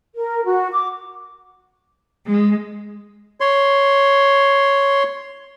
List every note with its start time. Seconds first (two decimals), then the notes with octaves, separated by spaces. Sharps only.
0.15 A#4
0.45 F#4
0.72 D6
2.25 G#3
3.40 C#5 C6